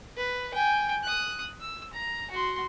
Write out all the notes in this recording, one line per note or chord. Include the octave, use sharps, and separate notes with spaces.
B4
G5 G#5
D#6 F#6
E6
A#5
F#4 C6